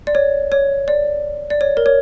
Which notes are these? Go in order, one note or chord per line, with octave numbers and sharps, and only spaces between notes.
D5
C#5
C#5
D5
D5
C#5
A#4
C#5